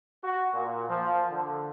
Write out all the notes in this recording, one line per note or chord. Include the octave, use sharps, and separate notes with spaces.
F#4
A#2
F3
D3